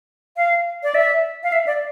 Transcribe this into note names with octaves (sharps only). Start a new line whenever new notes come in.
F5
D5
E5
F5
E5
D5